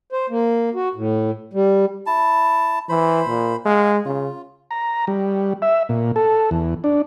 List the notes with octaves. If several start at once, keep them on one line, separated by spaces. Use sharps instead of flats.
C5
A#3
F#4
A2
G3
E4 A5
E3 C5 B5
A#2
G#3 F5
C#3 F4
A#5
G3
E5
A#2
A4
E2
D4